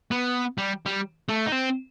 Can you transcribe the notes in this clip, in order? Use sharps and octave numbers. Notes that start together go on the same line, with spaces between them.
B3
G3
G3
A3
D#4
C4